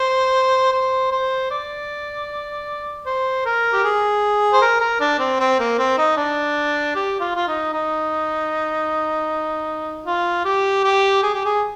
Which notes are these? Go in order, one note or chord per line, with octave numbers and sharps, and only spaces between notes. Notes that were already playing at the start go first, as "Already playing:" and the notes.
Already playing: C5
C5
C5
D5
C5
A#4
G4
G#4
C5
A#4
A#4
D4
C4
C4
A#3
C4
D#4
D4
G4
F4
F4
D#4
D#4
F4
G4
G4
G#4
G4
G#4